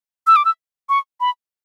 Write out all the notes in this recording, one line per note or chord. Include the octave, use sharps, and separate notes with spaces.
E6
D6
E6
C#6
B5